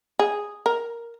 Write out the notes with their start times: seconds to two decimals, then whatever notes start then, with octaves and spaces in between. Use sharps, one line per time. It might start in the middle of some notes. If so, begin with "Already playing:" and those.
0.19 G#4
0.66 A#4